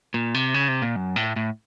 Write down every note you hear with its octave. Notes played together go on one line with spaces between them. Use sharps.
A#2
C3
C#3
C3
A#2
F#2
A2
A2